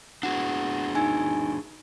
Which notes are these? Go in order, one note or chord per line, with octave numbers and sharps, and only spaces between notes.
D4 F#4 G#4 F#5
D#4 G#5